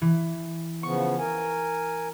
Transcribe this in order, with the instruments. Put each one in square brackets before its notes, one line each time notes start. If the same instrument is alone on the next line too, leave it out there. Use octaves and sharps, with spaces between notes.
[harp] E3
[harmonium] C#3 F3 B3 [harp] C#6
[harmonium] A#4 G#5